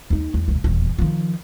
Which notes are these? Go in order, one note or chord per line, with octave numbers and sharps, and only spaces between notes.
D#2 D#4
E2
E1 D2
D#1 E2
D#3 F3